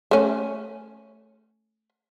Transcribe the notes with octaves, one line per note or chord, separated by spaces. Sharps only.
A3 C#4